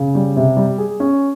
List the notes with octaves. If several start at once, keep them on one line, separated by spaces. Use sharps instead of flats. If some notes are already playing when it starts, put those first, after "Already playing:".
Already playing: C#3
G3
C3
G3
G#4
C#4